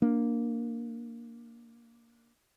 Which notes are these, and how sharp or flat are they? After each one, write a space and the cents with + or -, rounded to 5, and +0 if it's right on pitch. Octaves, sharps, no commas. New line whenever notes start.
A#3 +0 D4 +0